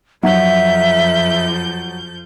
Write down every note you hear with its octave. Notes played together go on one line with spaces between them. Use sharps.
F2 F3 F#3 E5 G6